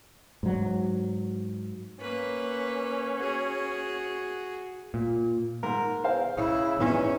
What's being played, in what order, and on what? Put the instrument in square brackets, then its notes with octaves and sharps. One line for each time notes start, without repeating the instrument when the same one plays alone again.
[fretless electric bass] G#2 F#3
[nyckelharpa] A#3 B4 [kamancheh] C#4
[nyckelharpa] F#4 G#4
[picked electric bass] A#2
[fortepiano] G#2 [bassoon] A#4
[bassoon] E2 [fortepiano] C5 F5
[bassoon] C#3 [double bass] E4
[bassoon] E2 [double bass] C#4 [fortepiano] D#4 E4